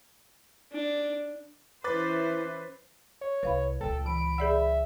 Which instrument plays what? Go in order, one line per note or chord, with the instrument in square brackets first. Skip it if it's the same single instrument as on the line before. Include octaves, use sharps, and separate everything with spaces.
[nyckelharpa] D4
[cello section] E3 C#4 E4 [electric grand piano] B4 A6 [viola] C5 [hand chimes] D6
[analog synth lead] C#5
[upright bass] C2 [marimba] B4 F5 B5
[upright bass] C#2 A#2 [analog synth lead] A4 [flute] G5
[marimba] E3 [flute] B5 [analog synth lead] D7
[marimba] G#4 D5 F#5 [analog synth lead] E5